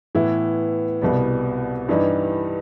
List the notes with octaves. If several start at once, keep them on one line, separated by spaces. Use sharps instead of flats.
A2 E3 B3 E4
C2 B2 G3 B3
G2 E3 G3 D#4